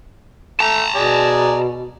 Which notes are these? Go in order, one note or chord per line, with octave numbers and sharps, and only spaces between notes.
A3 A5 A#5
B2 G#4 D5